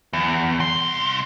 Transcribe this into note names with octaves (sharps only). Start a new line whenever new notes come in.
E2
C2 C6